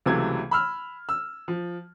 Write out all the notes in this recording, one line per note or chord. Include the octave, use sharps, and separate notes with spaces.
C#2 C3 E3 F#3 A3 G#6
B5 E6 F6
E6
F3